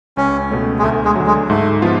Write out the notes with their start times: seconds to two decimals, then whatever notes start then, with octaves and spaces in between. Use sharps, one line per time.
0.17 C#2 C#4
0.51 B2 A3 C#4
0.79 G#3
0.83 D2 A3
1.05 G#3
1.16 D3 F#3
1.26 G#3
1.50 G#2 A3
1.82 F3 B3 F4